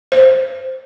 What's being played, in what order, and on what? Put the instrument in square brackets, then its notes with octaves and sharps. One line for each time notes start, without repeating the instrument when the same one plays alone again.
[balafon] C5